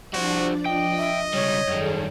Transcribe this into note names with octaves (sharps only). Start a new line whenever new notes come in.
F3 G3 D4 F#4 C5 D5
D#5 G5
E5
C#2 G3 C#5 G6 B6
F#2 D#3 G3 G#4 A4